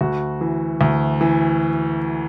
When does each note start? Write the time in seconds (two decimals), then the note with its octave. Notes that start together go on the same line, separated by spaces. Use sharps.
0.01 D2 F#4
0.41 E3
0.81 D2
1.21 E3